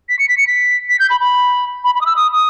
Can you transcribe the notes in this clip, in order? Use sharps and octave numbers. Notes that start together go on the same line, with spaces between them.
B6
C#7
B6
C#7
B6
B6
G6
B5
B5
B5
B5
D#6
E6
D#6
D#6